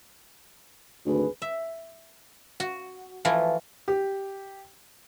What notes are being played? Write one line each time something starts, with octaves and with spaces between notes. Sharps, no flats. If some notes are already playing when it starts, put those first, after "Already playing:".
G#1 D2 G#4 B4
E5
F#4
E3 F3 A3 F4
G4